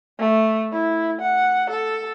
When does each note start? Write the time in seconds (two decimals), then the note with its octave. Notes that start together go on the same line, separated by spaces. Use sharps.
0.19 A3
0.72 E4
1.22 F#5
1.70 A4